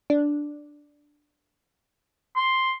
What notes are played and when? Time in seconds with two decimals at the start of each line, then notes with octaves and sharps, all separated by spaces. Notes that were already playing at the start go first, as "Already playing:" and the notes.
0.10 D4
2.36 C6